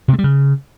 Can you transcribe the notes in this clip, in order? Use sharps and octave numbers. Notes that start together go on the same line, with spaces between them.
C3
A3
G3
C#3